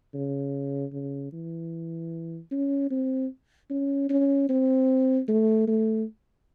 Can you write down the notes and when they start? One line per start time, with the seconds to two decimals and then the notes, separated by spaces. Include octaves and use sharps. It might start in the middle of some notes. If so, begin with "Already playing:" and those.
0.14 C#3
0.93 C#3
1.33 E3
2.52 C#4
2.91 C4
3.70 C#4
4.10 C#4
4.49 C4
5.29 A3
5.68 A3